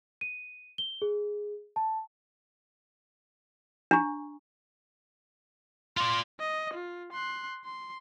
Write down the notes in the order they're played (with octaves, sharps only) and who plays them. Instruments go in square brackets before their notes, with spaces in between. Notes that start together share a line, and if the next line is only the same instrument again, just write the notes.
[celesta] D#7
G7
G#4
A5
[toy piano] D4 [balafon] G#5 A#5 C#6
[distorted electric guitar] F4 D5 [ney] C6
[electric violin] D#5
F4
C6 F#6
C6